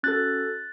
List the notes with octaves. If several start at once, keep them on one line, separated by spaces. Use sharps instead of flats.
C#4 F#4 A4 F#6 A6